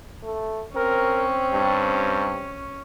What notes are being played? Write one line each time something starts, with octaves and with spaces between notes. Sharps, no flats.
A3
C4 C#4 A#4
G2